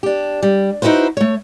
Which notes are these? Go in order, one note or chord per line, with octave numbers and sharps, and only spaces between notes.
D4 G4
G3
D#4 E4 F#4 B4 C5
A3 C#5